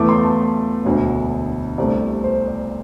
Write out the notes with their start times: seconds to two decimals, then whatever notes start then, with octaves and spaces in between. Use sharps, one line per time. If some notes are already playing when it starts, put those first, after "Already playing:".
Already playing: E2 E3 A3 D6
0.09 C6
0.23 A5
0.85 E1 D2 D3
1.78 C2 C3 A3 D5
2.24 C5
2.47 D5